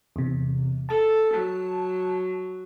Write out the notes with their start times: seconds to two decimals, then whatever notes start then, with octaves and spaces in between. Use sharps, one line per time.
0.16 E2 C3
0.89 A4 A5
1.33 F#3